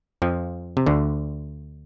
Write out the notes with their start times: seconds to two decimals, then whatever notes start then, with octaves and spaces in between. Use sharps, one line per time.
0.22 F2 F3
0.77 C3
0.86 D2 D3